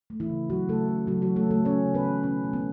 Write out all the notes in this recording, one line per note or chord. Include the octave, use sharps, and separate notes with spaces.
A3
E3 E4
C#3
E3 F#3 F#4
C#3 A3 A4
A3
C#3 F#3 F#4
E3 F#3 F#4
A3 A4
C#3 A3 A4
A3 C#4 C#5
C#3
B3 B4
E3
B2 C#4
A3
B3